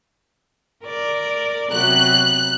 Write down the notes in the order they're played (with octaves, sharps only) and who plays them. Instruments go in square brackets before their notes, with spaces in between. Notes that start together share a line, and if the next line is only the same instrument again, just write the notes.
[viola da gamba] A#4 D5
[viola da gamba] C3 F#3 B3 [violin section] F#6